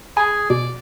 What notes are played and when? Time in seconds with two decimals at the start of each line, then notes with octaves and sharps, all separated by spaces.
0.17 G#4 G#5 B5
0.50 B2 D5